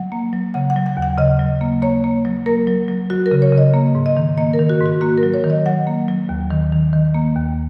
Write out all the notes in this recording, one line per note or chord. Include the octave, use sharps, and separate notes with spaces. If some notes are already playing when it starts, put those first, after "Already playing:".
Already playing: F#3 F#5
A#3
F#3
C#3 F#5
F#5
F#3
F#5
D#2
F#5
C#3 D#5
F#3
A#3
A#3 C#5
A#3
F#3
A#3 A#4
F#3
F#3
F#3 F#4
A#4
C#3
C#5
C#3
D#5
A#3
G#2
D#5
D#3
A#3 D#5
A#4
D#3
F#4
G#2 F#4
A#3 F#4
A#4
F#3
C#5
D#3
D#5
F#3 F#5
A#3
F#3
D#2
D#3
D#3
D#3
A#3
D#2